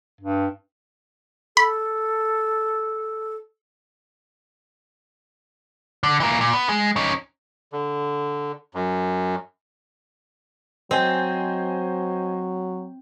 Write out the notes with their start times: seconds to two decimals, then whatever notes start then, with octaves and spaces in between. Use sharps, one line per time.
0.21 G2
1.57 A4 B5
6.03 D3
6.20 E3 A#3
6.41 A#2
6.53 B3
6.69 G#3
6.96 C#4 D#4
7.73 D3
8.74 F#2
10.91 F#3 C4 C5 D#5 G#5